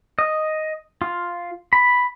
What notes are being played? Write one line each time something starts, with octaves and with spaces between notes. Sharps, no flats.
D#5
F4
B5